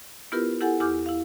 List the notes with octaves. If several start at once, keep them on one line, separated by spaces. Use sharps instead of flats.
B3 E4 F4 G4 A#4 B4
E4 G4 A4 F#5 G#5
E2 E4 G4 D6 F6 G6
E4 F5